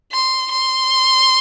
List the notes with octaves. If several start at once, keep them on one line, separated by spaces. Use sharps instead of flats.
C6
C6